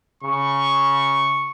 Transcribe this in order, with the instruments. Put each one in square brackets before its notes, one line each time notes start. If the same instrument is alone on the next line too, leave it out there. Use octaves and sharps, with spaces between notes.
[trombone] C#3 [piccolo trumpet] C#6